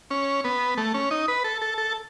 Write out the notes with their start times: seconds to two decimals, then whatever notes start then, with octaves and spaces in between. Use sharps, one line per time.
0.11 C#4
0.44 B3
0.77 A3
0.94 C#4
1.11 D#4
1.28 B4
1.44 A4
1.62 A4
1.78 A4